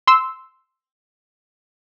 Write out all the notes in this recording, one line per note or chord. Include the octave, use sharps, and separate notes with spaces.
C6 E6